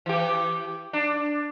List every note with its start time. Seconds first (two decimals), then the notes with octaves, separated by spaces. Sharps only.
0.06 E3 G4
0.93 D4